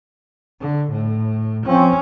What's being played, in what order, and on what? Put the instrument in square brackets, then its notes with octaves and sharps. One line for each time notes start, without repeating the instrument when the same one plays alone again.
[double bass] D3
A2
[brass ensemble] F3 C4 [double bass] C#4